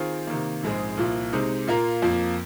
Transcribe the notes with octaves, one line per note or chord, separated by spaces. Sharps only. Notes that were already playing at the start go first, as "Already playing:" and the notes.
Already playing: D#3 C4 F4 G#4
C3 D#3 A#3
A#1 G#2 G#3 C4 G#4
C2 A#2 F3 A#3
C3 G#3 C4 D#4
A#2 A#3 F4 A#4
F2 F3 A#3